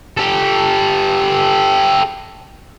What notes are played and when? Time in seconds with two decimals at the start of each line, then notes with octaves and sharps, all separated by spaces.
0.17 G4 A4